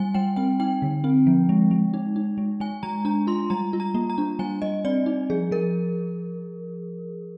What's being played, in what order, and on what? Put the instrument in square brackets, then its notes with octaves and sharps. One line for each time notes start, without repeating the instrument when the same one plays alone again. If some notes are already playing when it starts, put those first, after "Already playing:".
Already playing: [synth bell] G3 G#5
G3 G5
C4 G5
D#4 G5
D3
C4
F3
G#3
G#3
D#4
D#4
G#3
G#3 G#5
G#3 A#5
D4 A#5
F4 C6
G3 A#5
F4
A#5
A#3
A#5
D4
G3 G#5
G3 D#5
C4 D5
D#4
F3 G#4
F3 A#4